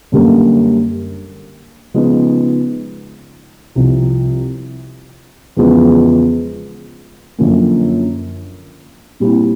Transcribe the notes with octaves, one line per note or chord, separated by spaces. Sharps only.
F#2 D3 G3 A#3
C#3 F3 G#3 B3 D#4
C2 C3 F3
E2 C#3 F3 G#3 B3
F#2 D3 F3 A#3 C#4
A#2 G3 C4 E4